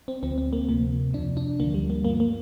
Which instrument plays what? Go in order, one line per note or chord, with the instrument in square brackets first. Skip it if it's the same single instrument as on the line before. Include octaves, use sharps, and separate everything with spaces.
[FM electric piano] C4
D2 D3 F3 C4
C4
A#3
D2 C3 F3 A#3
F2 C3 F3 D4
D4
D2 D3 F3 A#3
G3
A#3
G2 A#3
F3
A#3